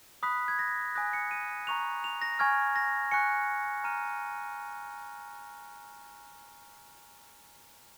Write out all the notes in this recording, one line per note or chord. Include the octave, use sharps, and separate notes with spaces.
B5 D#6 F#6 B6
G#6
A#6
G#5 D#6 F#6 A#6
C#7
D#7
A#5 C#6 F#6 F7
F7
A#6
G#5 C#6 F6 G#6
A#6
G#5 C#6 F#6 C#7
A#5 F6 D#7